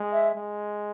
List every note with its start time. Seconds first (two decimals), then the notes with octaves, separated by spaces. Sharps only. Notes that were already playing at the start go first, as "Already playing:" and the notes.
Already playing: G#3
0.13 E5
0.35 G#3